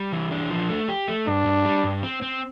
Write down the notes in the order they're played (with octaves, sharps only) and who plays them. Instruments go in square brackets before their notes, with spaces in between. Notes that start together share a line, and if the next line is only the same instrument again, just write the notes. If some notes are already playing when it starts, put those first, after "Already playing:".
Already playing: [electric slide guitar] G3
E3
D4
F3
A3
G4
A3
[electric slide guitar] G2 [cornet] D4
[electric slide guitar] G2
G3
G2
C4
C4